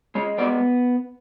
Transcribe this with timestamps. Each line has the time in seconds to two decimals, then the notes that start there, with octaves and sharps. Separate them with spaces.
0.15 G#3 C#5
0.38 B3 D5